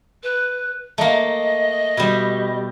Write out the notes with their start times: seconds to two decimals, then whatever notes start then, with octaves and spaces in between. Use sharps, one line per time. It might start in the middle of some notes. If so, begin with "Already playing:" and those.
0.23 B4
0.98 A3 A#3 D#5
1.97 B2 G3